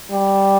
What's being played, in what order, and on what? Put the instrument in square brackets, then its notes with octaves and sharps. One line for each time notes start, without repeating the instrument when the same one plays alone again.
[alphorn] G3